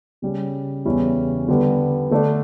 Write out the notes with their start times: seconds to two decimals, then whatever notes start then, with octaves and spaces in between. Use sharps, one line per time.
0.22 C#3 G3 C#4
0.85 E2 C#3 G3 C#4 E4
1.48 D3 G3 B3
2.11 D3 A3 D4